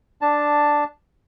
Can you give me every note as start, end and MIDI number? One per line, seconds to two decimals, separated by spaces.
0.21 0.84 62
0.21 0.84 81